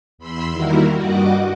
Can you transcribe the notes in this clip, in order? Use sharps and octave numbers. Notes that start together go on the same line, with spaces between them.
E2 B5 C6 E6
D#3 G3 A#3 E4 F#4 A#4
G2 G3 F#4 D#5 F#5 D6